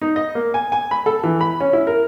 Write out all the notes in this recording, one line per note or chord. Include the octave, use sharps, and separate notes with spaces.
D#4
D#5
A#3
G#5
G#5
B5
A4
E3
B5
C#4
E4
A#4